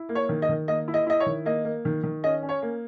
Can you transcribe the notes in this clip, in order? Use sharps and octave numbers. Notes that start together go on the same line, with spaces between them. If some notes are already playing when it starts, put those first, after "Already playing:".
Already playing: E4
A#3
C#5
D#3
D#5
D#3
A#3 D#5
E4
D#5
E4 D#5
C#5
D#3
A#3 D#5
A#3
D#3
D#3
C#4 D#5
C#4
C#5
A#3